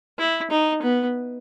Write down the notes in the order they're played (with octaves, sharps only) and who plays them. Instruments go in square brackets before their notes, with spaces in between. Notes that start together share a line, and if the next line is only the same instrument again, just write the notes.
[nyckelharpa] E4
D#4
B3